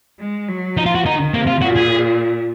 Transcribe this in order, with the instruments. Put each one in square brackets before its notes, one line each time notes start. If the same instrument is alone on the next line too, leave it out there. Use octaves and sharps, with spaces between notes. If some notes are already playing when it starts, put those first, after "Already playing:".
[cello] G#3
F#3
[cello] F3 [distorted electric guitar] D#4
[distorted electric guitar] F4
F#4
[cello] D#3 [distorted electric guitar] D#4
[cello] C3 [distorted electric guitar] A#3
[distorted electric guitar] F4
[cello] A#2 [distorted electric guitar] F#4
[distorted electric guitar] G#4